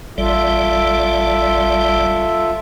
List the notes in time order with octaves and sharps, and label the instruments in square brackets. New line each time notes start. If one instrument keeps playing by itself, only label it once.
[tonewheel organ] A1 G3 D5 [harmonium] F4 A4 E5